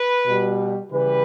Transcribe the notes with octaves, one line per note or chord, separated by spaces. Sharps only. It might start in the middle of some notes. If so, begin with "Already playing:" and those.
Already playing: B4
B2 G3
C#3 E3 G3 B4